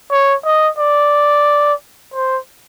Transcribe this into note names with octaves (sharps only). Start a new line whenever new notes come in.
C#5
D#5
D5
C5